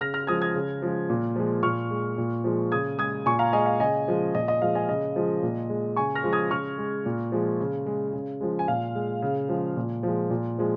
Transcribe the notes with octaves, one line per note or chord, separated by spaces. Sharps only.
C#3 F6 A#6
F6 A#6
F3 G#3 D#6 G#6
D#6 G#6
C#3
F3 G#3
A#2
F3 G#3
A#2 C#6 F6
G#3
A#2
F3 G#3
C#3 D#6 G#6
G#3 D#6 G#6
A#2 G#5 C#6
F5 A#5
G#3 D#5 G#5
F5
C#3 D#5 G#5
F3 G#3
A#2 D#5
D#5
F3 G#3 F5
D#5 G#5
C#3 D#5
F3 G#3
A#2
G#3
C#3 G#5 C#6
F6 A#6
F3 G#3
D#6 G#6
C#3 C#6 F6
G#3
A#2
F3 G#3
C#3
G#3
C#3
F3 G#3
G#5
A#2 F5
G#3
C#3
F3 G#3
A#2
F3 G#3
A#2
F3 G#3